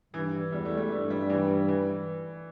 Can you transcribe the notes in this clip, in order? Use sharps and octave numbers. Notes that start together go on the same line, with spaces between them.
G2 E3
E2 G3
A3
G3
G2 A3
G3
E3
E3